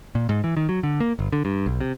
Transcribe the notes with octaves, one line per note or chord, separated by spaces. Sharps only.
A#2
G#2
E3
D#3
F#3
D3
A#3
G1
D3
G2
B1
C3